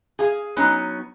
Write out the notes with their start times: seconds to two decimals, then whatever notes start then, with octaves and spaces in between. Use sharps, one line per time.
0.19 G#4 F5
0.56 F#3 B3 C#4 D#4